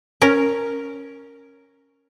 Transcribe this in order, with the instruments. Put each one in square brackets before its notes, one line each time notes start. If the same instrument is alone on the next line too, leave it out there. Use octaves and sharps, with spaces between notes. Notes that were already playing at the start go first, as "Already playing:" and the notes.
[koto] C#4 A#4